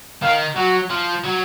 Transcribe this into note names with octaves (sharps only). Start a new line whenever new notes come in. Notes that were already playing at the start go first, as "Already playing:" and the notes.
D#3 F5
F#3 F#4
F3
F#3